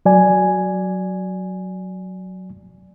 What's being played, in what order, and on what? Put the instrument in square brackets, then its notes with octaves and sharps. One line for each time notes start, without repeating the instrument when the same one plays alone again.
[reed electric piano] F#3 D5 G#5